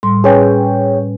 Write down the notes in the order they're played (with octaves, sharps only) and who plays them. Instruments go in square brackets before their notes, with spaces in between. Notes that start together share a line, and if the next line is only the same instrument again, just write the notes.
[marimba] A2 G3 C6
[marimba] C#4 B4 G#5 [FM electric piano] G#4 C#5 G5